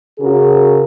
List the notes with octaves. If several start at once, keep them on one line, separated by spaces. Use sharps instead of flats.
C#3 F#4 G#4 A#4